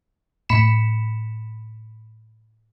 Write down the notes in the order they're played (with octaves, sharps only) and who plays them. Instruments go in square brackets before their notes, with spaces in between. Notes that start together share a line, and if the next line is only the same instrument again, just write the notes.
[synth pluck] A2 B5 B6 C#7 E7